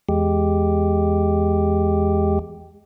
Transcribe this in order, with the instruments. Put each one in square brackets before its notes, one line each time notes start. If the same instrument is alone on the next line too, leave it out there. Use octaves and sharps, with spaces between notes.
[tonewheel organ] E2 G#3 G4